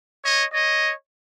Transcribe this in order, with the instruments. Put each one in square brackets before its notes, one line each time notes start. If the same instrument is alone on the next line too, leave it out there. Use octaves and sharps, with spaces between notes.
[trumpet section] C#5 D#5
C#5 D#5